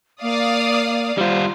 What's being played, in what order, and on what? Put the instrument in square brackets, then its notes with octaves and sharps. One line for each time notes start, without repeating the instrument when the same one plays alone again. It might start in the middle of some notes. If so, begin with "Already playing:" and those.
[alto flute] A#3 [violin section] D5 F5 D#6
[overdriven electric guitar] G3 F4 [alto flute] C5